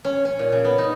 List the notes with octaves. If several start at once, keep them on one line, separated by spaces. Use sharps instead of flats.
C#4
C#4
A#2
C#3
B3
D#4